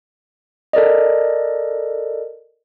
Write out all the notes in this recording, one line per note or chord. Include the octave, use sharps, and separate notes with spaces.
A4 A#4 D5 D#5